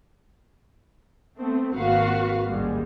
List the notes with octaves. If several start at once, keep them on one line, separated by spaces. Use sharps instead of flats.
A3 B3 C4
G#1 A#3 F#4 B4 F5 F#5
A1 D#2 G3 G#3